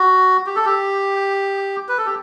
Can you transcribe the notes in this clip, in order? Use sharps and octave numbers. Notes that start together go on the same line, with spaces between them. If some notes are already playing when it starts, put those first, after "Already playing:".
Already playing: F#4
G4
A4
G4
B4
A4
G4